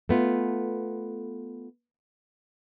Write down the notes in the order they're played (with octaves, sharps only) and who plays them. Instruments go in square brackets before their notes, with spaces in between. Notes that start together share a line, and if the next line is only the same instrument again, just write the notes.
[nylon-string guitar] A3 B3 F4